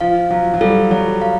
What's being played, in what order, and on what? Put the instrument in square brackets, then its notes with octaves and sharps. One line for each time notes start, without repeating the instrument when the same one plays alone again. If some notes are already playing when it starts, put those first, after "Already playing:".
[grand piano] F3 [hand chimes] F5
[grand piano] F#3 [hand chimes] F5
[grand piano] F#3
[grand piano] G3 [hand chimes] A4
[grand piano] F#3 [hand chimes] C#5
[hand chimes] F5